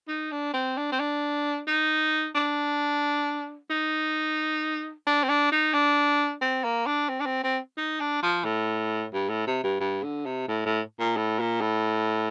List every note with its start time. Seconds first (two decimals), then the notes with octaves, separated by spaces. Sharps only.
0.08 D#4
0.32 D4
0.53 C4
0.77 D4
0.92 C4
1.00 D4
1.67 D#4
2.35 D4
3.70 D#4
5.07 D4
5.23 C4
5.29 D4
5.52 D#4
5.73 D4
6.41 C4
6.64 A#3
6.86 D4
7.09 C4
7.20 D4
7.26 C4
7.43 C4
7.77 D#4
8.00 D4
8.22 F3
8.44 A2
9.13 G2
9.29 A2
9.47 C3
9.64 G2
9.80 G2
10.03 D3
10.26 C3
10.48 A2
10.66 A2
10.99 A#2
11.16 A2
11.39 A#2
11.61 A2